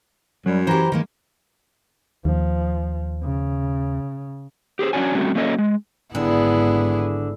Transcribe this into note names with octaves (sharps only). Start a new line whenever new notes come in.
F#2 F#3 G3
E3 G4 C5 A#5
D#3 G#3 A#3
D#2 F3
C#3
G4 G#4 A#4 C5
C#4 D4 F#4 C#5 G#5
G3 A3 C4 C#4 F#4
F#3 A#3 C#4 A4 C#5 D#5
G#3
G#1 D3 B3 E4 G#4